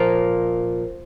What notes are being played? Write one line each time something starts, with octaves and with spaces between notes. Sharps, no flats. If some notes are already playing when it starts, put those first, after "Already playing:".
Already playing: A#2 F3 A#3 F4 A#4